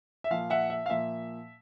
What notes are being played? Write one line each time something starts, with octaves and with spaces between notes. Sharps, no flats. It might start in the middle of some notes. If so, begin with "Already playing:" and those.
E5
A#2 F3 F5
E5 F#5
E5
F5
A#2 F3 E5